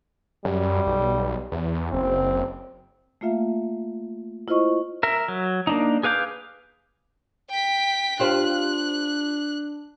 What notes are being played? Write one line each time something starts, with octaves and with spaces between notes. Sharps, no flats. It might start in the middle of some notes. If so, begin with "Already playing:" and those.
F#2 G3
B1
E2
F#1 C4
A3 A#3 F4 E5 F5
E4 F4 C5 D#5 C#6
A#4 E5
F#3
A#3 D4 D#4
G#4 B4 F5 D6 G6
G5 B6
D4 F4 G4 C5 F#6